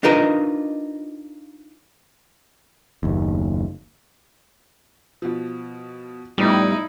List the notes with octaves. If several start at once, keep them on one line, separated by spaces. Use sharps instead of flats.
D4 D#4 F4 A#4 B4 D#5
F#1 D#2
B2 F3
A2 F3 G3 B3 D#4 E4